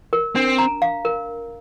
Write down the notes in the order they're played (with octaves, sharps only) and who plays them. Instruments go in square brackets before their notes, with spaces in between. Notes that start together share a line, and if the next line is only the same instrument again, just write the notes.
[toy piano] A#4
[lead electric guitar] C4 [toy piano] D4
[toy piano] A#5
F5
A#4